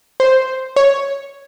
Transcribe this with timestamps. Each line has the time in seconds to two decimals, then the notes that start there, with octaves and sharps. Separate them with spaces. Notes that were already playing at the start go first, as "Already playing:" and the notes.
0.20 C5
0.76 C#5